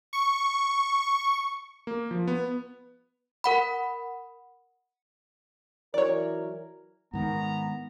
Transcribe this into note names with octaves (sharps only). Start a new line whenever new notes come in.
C#6
A#3
F3
B3
A#4 F#5 B5
E3 F#3 A#4 C#5 D5
G#2 D#3 B3 A#5